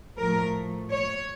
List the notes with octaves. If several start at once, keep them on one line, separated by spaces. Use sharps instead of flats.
A2 F3 A3 A#4
C#5